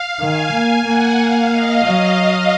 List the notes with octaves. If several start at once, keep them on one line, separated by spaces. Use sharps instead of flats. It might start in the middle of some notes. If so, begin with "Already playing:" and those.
Already playing: F5
D#3 G#5
A#3 G#5
A#3 F#5
F5
D#5
F#3